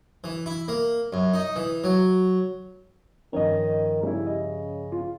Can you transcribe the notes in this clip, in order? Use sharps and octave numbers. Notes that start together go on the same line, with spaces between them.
E3
E4
A#3
F#2
D#4
E3
F#3
G2 D#3 F3 C#4 C#5 D#5
C#3 G3 E4
D#5
F4